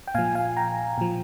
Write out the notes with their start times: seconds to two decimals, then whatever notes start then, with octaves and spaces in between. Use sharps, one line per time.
0.08 G5
0.15 A#2 F3 F5 G#5
0.35 F5 G#5
0.57 G5 A#5
0.98 A#2 F3